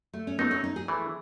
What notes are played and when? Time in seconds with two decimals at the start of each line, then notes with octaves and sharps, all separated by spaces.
0.13 A3
0.27 C#4
0.38 F#3 A3 B3 D#4
0.51 C#4
0.64 D#4
0.76 G#4
0.88 E3 A3 E4